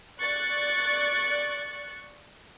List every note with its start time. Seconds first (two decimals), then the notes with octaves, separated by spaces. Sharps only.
0.21 D5 C#6 F#6 A6